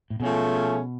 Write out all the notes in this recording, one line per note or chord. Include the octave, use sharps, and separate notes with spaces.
A2
B2 F3 A3 C#4 G#4